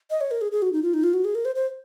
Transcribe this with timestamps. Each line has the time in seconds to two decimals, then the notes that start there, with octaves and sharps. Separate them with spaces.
0.10 D#5
0.21 C#5
0.31 A#4
0.41 G#4
0.52 G#4
0.62 F#4
0.73 D#4
0.83 F4
0.94 D#4
1.04 F4
1.14 F#4
1.25 G#4
1.35 A#4
1.45 C5
1.55 C5